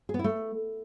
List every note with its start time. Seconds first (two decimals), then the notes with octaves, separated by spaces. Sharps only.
0.09 G#4
0.14 B3
0.19 E4
0.24 A3